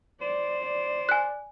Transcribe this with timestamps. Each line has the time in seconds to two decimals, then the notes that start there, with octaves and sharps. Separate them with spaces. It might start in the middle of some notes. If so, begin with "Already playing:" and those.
0.21 C5 D5
0.66 D5
1.09 G#5 F#6